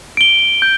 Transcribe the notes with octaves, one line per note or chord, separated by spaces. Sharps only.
D7 G7
G6